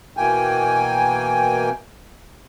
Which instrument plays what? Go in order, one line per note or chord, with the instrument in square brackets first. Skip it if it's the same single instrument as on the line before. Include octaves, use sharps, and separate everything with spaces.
[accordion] B2 E3 A#3 G5 G#5